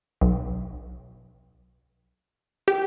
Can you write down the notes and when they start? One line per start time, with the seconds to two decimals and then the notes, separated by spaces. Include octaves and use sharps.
0.21 B1
2.68 G4